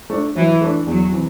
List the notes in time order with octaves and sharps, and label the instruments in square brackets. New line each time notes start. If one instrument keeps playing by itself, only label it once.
[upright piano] A3 D4
[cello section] E3 [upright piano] F#3
[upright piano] A3 D4
[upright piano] E2 [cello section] F#3
[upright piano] C3 E3